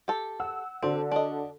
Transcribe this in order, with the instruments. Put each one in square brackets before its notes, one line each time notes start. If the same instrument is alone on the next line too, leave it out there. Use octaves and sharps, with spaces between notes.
[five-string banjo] G4 A4
[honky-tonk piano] F#5 E6
[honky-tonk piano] D3 F#4 A4 [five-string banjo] C4
[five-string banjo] D4 D#5